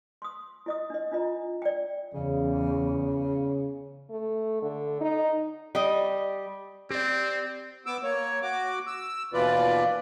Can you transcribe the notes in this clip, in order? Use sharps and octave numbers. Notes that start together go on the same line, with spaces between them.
C6 D#6
E4 D#5 D#6
D4 D#5
D4 F4 D#5 A#5
D5 G5
E2 C#3
A3
D3
D#4
G3 D#5
C4 G4 D5
B3 D6 E6
A#3 C#5
F#4 D6
E6
D#2 B2 E3 F4 B4 D5